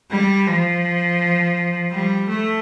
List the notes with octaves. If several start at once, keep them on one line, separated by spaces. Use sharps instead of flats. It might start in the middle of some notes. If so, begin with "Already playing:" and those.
G3
F3
G3
A3